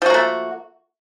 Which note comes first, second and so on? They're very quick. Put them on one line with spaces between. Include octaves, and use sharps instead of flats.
F3 F#4 A#3 A3